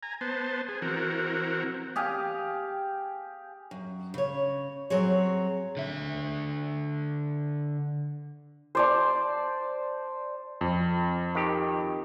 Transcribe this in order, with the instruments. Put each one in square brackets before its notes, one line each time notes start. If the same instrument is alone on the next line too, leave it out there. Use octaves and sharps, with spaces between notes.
[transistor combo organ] G#5 A#5
B3 C5 A5
G#4
E3 C4 F#4 A#4
[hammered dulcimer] G4 G#4 F5 G5
[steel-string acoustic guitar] F#2
C#3 C#5
F#3 C4 G#4 C#5
[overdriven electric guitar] D3 E5
[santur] C5 D5 A5
[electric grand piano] F2
[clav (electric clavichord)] D#3 G4